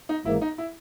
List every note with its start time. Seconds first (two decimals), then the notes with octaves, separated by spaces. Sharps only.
0.09 D#4
0.25 G#1 G#2 E3 A#3 E4
0.41 D#4
0.58 E4